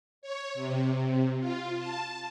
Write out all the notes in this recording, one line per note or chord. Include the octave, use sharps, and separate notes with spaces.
C#5
C3
F4
A5